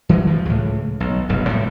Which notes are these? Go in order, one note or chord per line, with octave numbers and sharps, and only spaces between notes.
E3 F#3 G#3
G2 F3
C#2 A2
B1
F1 B1 G2
A2 G3